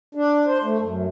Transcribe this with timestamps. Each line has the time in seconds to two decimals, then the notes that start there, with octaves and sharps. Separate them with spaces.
0.15 D4
0.47 C5
0.64 A3
0.81 F#2